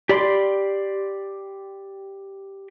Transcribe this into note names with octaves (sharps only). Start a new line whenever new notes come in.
G4 D5 B5 C6 D6